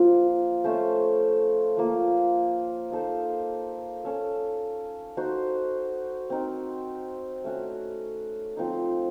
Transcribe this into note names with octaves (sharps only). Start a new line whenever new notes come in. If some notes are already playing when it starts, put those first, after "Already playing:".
Already playing: F3 A#3 F4
A3 C#4 A4 C5
F3 A#3 F4
A#3 D#4 A4 C5
C#4 A4 C#5
D#4 F#4 C5
C4 D#4 A#4
A3 C#4 F#4
F3 C4 D#4